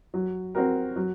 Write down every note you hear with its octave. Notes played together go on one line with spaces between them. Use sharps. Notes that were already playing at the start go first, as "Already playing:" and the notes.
F#3
C4 F#4 A#4
F#3